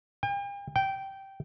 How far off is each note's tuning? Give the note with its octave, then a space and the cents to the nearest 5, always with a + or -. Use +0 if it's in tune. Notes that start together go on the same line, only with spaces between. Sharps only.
G5 +45
G5 -10